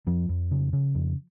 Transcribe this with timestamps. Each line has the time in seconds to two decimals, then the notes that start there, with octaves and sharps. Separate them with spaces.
0.07 F2 F3
0.29 F2
0.51 C#3
0.73 C#3
0.95 F2